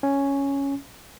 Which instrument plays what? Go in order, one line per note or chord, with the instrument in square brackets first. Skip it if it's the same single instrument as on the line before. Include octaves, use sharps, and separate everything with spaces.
[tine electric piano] C#4